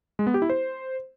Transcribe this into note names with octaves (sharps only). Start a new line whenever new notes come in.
G#3
B3
G4
E4
C5